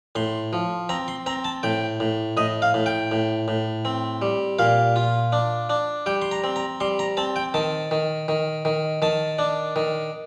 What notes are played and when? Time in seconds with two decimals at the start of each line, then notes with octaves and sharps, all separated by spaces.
0.15 A2 C6
0.53 F3
0.89 C4 A#5
1.08 C6
1.26 C4 A#5
1.44 A5
1.63 A2 G5
2.00 A2
2.37 A2 D#5
2.62 F5
2.74 A2
2.86 G5
3.12 A2
3.48 A2
3.85 C4
4.22 G3
4.59 A#2 F5
4.96 F4
5.32 D4
5.70 D4
6.06 G3 G5
6.22 C6
6.31 A#5
6.44 C4
6.56 A#5
6.80 G3 C6
6.99 A#5
7.17 C4 A5
7.36 G5
7.54 D#3 A5
7.91 D#3
8.28 D#3
8.65 D#3
9.02 D#3 A5
9.39 D4
9.76 D#3